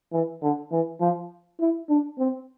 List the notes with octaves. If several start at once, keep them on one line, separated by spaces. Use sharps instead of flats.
E3
D3
E3
F3
E4
D4
C4